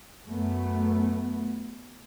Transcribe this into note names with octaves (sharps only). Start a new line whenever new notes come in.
F#2 A3 B3